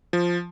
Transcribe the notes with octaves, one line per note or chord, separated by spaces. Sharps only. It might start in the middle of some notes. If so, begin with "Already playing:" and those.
F3